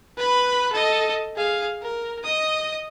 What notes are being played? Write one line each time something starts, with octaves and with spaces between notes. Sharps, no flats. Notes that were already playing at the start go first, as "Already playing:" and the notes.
B4 B5
A4 D#5
G#4 F5
A#4
D#5 D#6